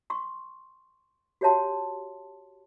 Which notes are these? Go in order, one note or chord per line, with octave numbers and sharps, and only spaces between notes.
C6 C#6
F#4 G4 C#5 E5 A5 C6